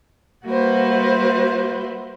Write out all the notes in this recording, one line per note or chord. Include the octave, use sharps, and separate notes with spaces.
G3 A#3 F#4 B4 C5 E5